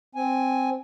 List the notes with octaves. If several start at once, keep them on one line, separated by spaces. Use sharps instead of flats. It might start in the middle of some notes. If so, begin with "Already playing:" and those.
C4 G#5